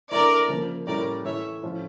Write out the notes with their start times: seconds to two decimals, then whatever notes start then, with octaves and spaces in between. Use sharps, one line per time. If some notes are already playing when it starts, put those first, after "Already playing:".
0.11 E3 A3 D4 A#4 D5
0.48 C#3 F3 A#3
0.87 A2 G3 C#4 E4 A#4 D5
1.25 E3 A3 E4 C#5 E5
1.63 A2 F3 A3 C#4 F4